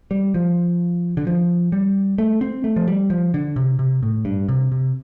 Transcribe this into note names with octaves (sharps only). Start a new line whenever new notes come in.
G3
F3
D3
F3
G3
A3
C4
A3
F3
G3
F3
D3
C3
C3
A2
G2
C3
C3